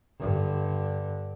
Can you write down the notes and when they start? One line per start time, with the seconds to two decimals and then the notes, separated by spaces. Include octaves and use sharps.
0.19 G2 D3